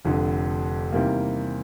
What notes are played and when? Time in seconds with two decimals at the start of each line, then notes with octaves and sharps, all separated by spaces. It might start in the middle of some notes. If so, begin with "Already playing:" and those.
0.05 F1 F2 D3
0.92 E2 C3 D#3 G3 A#3